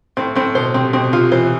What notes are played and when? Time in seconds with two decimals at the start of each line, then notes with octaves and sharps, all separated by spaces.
0.17 A2 C4
0.35 A2 C4
0.55 B2 C5
0.74 C3 C4
0.93 B2 C4
1.12 C3 F4
1.31 E3 C5